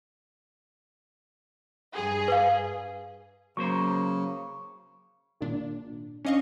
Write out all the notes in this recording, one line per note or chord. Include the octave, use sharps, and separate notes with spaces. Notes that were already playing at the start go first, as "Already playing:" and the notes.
G2 G#4
B4 F5
C#3 F#3 A#3 C5 C#6
G#1 A#2 D4
C#4 D4 D#5 F5 C#6